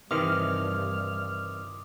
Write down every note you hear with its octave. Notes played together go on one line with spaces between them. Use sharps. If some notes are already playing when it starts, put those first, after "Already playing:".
G2 C3 D#3 E3 C6 D6 D#6 F6